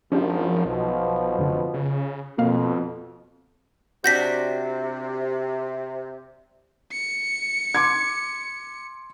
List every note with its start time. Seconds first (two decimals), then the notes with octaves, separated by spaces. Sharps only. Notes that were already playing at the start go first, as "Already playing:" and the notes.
0.12 G#1 F#2 F3 C#4 D4 G4
0.65 B1 B2 F3
1.38 F1 F#2 D3
1.74 C#3
2.38 F2 B2 A#3 F5
4.04 C3 D4 F#4 G6 A#6 B6
6.92 C#7
7.75 C6 D6 G#6